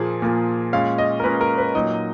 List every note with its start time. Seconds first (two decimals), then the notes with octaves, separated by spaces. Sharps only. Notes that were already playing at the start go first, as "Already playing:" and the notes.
Already playing: A#2 F3 A#3 G#4
0.22 A#2 F3 A#3
0.73 A#2 G#3 C#4 F5
0.98 D#5
1.20 A#4
1.24 A#2 G#3 C#4 B4
1.41 A#4
1.58 B4
1.75 A#2 F#3 A#3 D#4 D#5